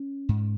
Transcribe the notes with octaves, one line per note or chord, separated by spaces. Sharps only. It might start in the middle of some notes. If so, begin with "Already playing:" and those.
Already playing: C#4
G#2